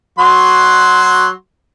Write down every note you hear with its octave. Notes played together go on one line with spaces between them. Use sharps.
F#3 F#4 C6